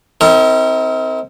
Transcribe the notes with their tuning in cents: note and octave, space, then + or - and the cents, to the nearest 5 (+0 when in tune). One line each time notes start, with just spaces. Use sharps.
C4 +0 D#4 +45 A#4 -35